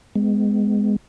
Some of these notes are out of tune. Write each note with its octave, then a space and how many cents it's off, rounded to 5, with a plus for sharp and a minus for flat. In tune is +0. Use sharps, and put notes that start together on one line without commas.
G#3 +0 B3 +30